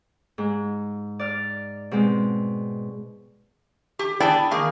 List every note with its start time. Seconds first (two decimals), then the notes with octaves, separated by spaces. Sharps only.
0.38 G#2
1.19 D5 F6
1.91 B2 G#3 C4
3.99 G4
4.20 B3 D4 E4 G#4 D5 G5
4.51 D#3 A#3 G#4